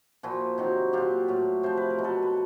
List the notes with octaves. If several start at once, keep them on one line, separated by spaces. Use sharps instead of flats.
A#2 F3 E4 F#4
C3 D#3 F#3
A#2 F#3 F4 G4
A2 F#3
C3 F3 C5
B4
A#4
B2 F#3
A4 B4
B4